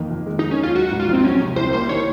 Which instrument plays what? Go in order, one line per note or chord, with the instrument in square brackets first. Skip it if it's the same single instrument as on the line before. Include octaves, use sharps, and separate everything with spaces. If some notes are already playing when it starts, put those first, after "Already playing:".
Already playing: [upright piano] F2 D#3 A#3
F2
G#3
[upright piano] D#3 [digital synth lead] D#4
[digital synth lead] C#4
[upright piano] D#2 [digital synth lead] F4
[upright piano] F#3 [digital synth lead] F#4
[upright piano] G#2
[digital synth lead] F4
[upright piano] A#1 [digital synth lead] C4
[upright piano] F#3 [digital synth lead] C#4
[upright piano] C3
[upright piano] C2 [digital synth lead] C5
[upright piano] A#3 [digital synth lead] C5
[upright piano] D#3 [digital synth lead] C#5